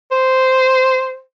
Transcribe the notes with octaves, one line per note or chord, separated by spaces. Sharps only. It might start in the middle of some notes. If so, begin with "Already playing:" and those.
C5